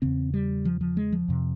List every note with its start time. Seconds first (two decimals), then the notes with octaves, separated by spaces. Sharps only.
0.02 E2 C#3 C4
0.34 G3
0.65 F3
0.81 F3
0.97 G#3
1.13 F3
1.28 F2 C3